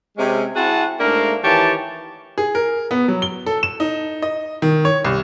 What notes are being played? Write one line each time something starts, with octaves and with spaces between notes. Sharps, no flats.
C3 G#3 C#4
C4 E4 F#4 G#4 F#5 A5
G#2 A3 A#3 D4 F5 A#5
D#3 E3 G4 C#5 A5
G#4
A#4
B3
F#3
G7
A4
E7
D#4
D#5
D#3
C#5
C2